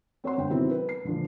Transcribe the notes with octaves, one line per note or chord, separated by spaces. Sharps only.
C4 C#5 F#5 C6
G1 G5
C3 D#3 F#3 B3 C4 E4
B4
C7
A#1 D3 F3